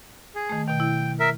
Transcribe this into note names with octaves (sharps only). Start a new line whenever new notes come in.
G#4
D#3 A3
B2 D#3 G5
E4
A#4 E5